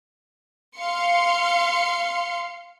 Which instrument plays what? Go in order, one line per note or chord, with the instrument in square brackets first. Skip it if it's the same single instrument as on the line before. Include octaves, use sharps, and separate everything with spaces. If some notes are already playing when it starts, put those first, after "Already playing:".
[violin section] F5 C6 C#7